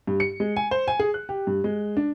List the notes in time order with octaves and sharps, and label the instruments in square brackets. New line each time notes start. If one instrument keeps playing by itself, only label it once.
[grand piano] G2
C#7
G#3
G#5
C5
G#5
G#4
F#6
G4
G2
G#3
D4